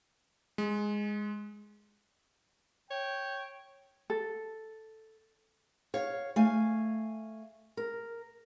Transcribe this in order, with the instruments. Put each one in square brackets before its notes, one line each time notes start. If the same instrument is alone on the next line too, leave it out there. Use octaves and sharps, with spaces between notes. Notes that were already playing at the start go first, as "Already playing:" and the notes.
[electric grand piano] G#3
[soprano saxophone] C#5 [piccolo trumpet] G5
[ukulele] A4
[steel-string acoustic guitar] C#5 F5
A3 F5 G#5
A#4